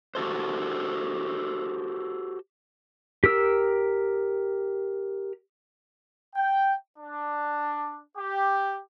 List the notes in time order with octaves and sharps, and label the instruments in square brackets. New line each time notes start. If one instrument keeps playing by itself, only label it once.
[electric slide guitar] F#4 G4 A4 C5
[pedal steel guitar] G4 A#4 E6
[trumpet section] G5
D4
G4